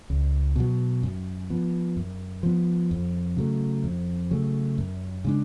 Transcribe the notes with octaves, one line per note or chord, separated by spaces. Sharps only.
C#2
B2 F#3
F#2
F3 B3
F#2
F3 B3
F2
C#3 F#3 A3
F2
C#3 F#3 A3
F#2
C#3 G#3 D4